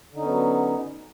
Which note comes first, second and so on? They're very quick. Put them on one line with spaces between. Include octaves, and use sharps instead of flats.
D3 D#4 C#4 B3 F#3